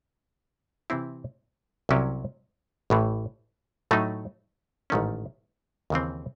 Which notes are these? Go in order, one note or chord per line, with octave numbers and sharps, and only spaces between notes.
C3 E3 C4 E4
C2 C3 F#3 C#4 E4
A1 A2 E3
A2 F#3 A3 D#4
A1 G#2 D#3 A3 C#4
D#2 C#3 E3 C4